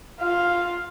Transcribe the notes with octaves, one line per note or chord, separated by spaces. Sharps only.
F4 F5